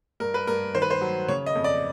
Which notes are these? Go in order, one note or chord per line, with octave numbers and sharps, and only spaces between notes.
G2 A#4
B4
G2 A#4
D#3 C5
B4
C5
F#3
C#3 C#5
D#5
F2
D5